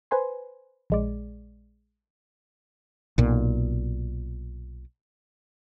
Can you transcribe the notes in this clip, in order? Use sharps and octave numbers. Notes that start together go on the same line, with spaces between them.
B4 C5 G#5 C6
A#1 G#3 D5
B1 A#2